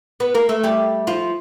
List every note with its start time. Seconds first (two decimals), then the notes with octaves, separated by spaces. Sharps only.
0.20 B3 B4
0.35 A#3 A#4
0.49 A3 A4
0.63 G3 G4
1.07 F3 F4